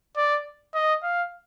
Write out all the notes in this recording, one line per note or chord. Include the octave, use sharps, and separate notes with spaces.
D5
D#5
F5